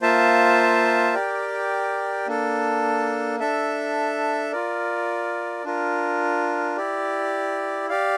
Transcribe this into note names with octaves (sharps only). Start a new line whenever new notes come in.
A#3 F4 C5 E5 A5
G4 A#4 D5 G5
A#3 D4 A4
D4 A4 E5
F4 A#4 D5
D4 F4 A#4
E4 G4 D5
G4 D5 F5